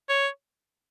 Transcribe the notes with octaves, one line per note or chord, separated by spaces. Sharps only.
C#5